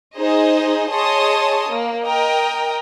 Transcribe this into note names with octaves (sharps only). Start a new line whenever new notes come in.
D#4 G#4 C5 D#5
G#4 C#5 D#5 A5 C6 D#6
A#3
A#4 D#5 G5